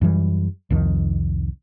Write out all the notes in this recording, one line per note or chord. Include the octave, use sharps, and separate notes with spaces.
F#2 E3 G3
C2 F2 D#3